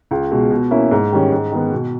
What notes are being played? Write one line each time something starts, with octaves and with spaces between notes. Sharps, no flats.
C#2
B2 G#3
B2
A#3 C#4 E4
G#2
D#3 G3 C#4
G#2
D#3 G#3 B3
B2